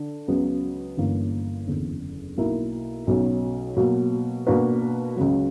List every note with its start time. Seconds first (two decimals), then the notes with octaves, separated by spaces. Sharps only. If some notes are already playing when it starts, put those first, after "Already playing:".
Already playing: D3 D4
0.28 C#2 C#3 F#3 B3
0.97 G1 G2 E3 A#3 C#4
1.67 F#1 E2 D3
2.37 B1 B2 A#3 E4 A#4
3.07 B1 B2 F#3 C#4
3.76 B2 F#3 A#3
4.47 B2 A#3 D4 F#4 B4
5.16 C#2 C#3 F#3